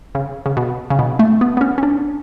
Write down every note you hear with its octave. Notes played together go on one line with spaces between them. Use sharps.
C#3
C#3
B2
C#3
B2
A3
B3
B3
C#4
C#4
D4